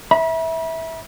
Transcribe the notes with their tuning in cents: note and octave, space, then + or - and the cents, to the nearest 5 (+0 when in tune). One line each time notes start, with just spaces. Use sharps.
E5 -15 B5 -45